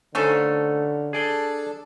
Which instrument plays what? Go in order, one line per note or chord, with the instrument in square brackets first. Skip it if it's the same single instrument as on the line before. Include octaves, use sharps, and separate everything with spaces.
[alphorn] D3 [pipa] D#3 F3 C#4 [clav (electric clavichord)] A3 A4 C5
[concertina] D4 A4 [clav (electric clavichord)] G#4 D5 G5